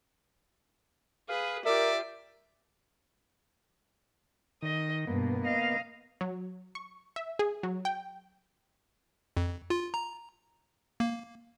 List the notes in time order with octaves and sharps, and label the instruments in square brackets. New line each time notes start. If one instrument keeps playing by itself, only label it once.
[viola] G#4 B4 [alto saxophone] F5
[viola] F4 G4 [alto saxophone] A#4 [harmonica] D5 [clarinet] E5
[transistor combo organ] D#3 [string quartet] D#5
[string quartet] G2 B2 [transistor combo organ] A#3 B3
[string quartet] D#5 F5
[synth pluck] F#3
C#6
E5
G#4
F#3
G5
[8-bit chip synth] F2
F4
A#5
A#3